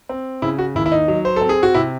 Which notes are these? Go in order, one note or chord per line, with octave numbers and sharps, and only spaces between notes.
C4
C#3 E4
F#4
D#2 E4
E4
D#4
F#3
C5
C4 A4
G#4
F#4
C3 E4